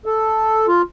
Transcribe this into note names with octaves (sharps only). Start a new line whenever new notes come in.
A4
F4